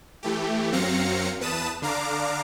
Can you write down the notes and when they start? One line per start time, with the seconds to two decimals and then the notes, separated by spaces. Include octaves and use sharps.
0.23 E3 A3 G4
0.71 F#2 F#3 C4 F5 A#6 C#7
1.40 E2 B4 A5 D#6 E7
1.82 D3 D4 F5 A#5 D6